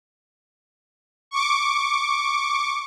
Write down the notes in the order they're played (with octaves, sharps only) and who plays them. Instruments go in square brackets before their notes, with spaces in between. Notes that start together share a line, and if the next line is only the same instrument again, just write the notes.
[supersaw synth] C#6 D6